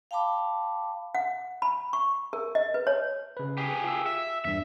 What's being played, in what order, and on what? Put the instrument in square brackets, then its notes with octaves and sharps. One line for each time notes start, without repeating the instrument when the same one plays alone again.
[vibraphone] F5 G5 A5 B5 D6
[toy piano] F#5
B5
C#6
A#4
D#5
B4
C#5
[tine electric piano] C#3 B4
[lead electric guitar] G4 G#4
[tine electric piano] F4 E6
[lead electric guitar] E5
[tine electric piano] E2 G2 [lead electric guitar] E5